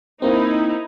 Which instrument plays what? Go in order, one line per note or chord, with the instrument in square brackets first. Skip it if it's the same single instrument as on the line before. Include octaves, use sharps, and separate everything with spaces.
[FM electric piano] A#3 C4 [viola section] D#4 E4